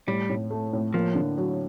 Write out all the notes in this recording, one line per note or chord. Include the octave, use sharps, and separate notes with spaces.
A2 G3
A2
A3
A2
F3 A#3
D3
F#3